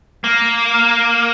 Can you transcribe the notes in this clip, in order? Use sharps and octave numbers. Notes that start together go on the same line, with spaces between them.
A#3